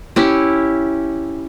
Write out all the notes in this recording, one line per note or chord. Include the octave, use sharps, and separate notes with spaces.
C#4 E4 G4